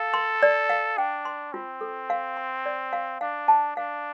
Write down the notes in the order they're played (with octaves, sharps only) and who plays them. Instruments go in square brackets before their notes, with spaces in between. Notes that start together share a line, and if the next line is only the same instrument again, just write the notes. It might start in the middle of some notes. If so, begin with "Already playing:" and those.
Already playing: [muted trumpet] A4 [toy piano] F5
[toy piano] C6
D5
F5
[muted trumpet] D4 [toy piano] G5
[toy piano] C6
[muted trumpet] C4 [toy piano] F4
[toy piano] A4
F5
C6
D5
F5
[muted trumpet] D4 [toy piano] F5
[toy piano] A5
[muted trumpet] D4 [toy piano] F5